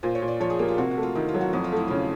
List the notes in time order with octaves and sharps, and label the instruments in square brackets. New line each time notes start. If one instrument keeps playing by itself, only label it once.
[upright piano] A#2 [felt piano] C5
[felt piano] C#5
[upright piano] A#2
[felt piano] D5
[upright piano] F3 [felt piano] C#5
[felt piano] G#4
[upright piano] A#3 [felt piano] G4
[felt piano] F4
[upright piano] C3 [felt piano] F#4
[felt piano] F#4
[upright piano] A3
[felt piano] F4
[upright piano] D#3 [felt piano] E4
[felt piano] F4
[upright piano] F#3
[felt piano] F#4
[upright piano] F2 [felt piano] F#4
[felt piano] F4
[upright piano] A3 [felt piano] E4
[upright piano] C#3 [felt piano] F4